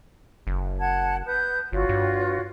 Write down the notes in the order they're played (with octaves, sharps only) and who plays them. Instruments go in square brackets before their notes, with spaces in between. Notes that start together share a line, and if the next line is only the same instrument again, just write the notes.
[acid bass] F#1
[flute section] F#5 A5 G#6
B4 D#6 G6
[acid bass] G1 [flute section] F4 F#4 C#5
[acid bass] G2